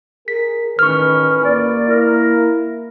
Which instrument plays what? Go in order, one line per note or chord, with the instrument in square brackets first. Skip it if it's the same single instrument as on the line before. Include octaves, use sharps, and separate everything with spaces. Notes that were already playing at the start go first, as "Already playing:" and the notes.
[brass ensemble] G#4 [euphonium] A#4 [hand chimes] B6
[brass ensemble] A1 B4 [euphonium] D#3 [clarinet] C#4 [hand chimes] C#6 F6
[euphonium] A#3 [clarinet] D5
[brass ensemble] E4 [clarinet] A#4